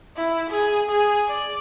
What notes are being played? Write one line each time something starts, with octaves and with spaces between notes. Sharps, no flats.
E4
G#4
G#4
D5